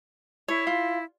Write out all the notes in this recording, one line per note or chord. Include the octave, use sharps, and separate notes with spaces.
E4 C#5
F4